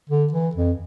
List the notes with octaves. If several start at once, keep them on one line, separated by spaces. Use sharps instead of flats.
D3
E3
F2